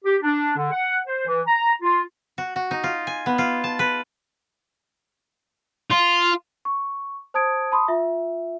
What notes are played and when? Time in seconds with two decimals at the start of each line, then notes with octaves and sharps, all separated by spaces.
0.05 G4
0.23 D4
0.57 D3
0.71 F#5
1.06 C5
1.27 E3
1.47 A#5
1.82 F4
2.38 F#4
2.56 F#4
2.71 D#4
2.84 F4
3.07 G#5
3.26 B3
3.38 F4
3.64 A5
3.79 B4
5.91 F4
6.65 C#6
7.34 C5 A5 D#6 G#6 D7
7.72 A5 B5 C6 D#6
7.88 F4 E5